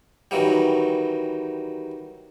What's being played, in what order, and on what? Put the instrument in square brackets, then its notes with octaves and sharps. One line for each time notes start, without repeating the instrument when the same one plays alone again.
[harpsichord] D#3 E3 F#3 G3